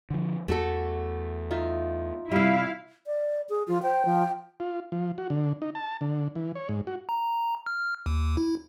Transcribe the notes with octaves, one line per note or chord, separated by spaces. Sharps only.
D3 F3
E2 A3 F#4 A4
D#4 F4 E5
C3 G3 E4 F5
D5
G#4
F3 F4
C5 G5
F3
F4
F3
F#4
D3
D#4
A5
D3
E3
C#5
G#2
F#4
A#5
F6
D#2
E4